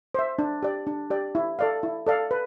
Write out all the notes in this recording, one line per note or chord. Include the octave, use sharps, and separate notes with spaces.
C5 E5
D4
G4 D5
D4
G4 D5
E4
A4 D5 F5
E4
A4 D5 F5
B4